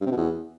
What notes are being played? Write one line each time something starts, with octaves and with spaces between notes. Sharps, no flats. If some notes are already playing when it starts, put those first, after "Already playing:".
G2
C3
B2
E2